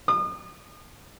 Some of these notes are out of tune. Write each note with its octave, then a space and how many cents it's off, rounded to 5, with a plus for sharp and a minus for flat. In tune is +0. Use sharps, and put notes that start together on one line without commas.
D#6 -40